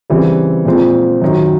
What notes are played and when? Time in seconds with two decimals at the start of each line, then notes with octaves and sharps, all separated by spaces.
0.10 C#3 E3 G3 C4
0.65 A#2 F3 G#3 C4
1.22 F#2 D#3 F#3